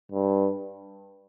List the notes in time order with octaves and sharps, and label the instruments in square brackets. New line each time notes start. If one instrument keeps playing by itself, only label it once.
[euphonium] G2